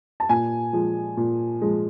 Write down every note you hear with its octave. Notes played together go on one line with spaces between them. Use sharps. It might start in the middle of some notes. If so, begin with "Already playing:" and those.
A5
A#2 G#5
F3 G#3
A#2
F3 G#3